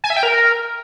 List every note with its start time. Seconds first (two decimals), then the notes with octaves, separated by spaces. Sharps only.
0.04 G#5
0.10 E5
0.17 G5
0.23 A#4